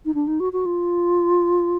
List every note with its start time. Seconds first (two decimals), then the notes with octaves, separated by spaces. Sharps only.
0.05 D#4
0.14 D4
0.27 D#4
0.40 F#4
0.53 F#4
0.65 F4